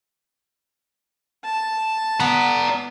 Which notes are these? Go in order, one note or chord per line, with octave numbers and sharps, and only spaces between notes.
A5
B3 D5 A#5